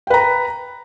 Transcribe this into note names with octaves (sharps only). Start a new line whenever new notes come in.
B4 G5 A#5